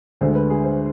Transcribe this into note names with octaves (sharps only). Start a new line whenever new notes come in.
D2 D3 G#3 C5
B4
G#4
C5